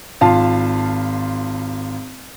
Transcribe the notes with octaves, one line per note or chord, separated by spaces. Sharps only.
G#1 F4 F5 A5